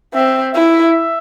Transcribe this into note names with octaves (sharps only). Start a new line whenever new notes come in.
C4 E5
E4 E5